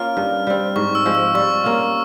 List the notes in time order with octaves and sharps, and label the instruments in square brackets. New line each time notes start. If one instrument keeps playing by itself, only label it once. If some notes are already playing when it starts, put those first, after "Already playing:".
Already playing: [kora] A#3 C#4 F4 [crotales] F6
[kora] G2
G3 C4
[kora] G#2 [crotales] C#6
[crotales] E6
[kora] F3 G#3 C4
[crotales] E6
[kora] G3 [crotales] C#6
[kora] A#3 C#4 F4